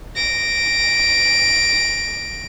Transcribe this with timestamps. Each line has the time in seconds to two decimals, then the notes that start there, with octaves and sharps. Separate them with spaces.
0.16 A#6 D7